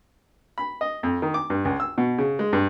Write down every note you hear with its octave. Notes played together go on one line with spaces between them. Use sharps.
B5
D#5
F2
D#3
D6
G2
C#2
E6
B2
C#3
G#3
G2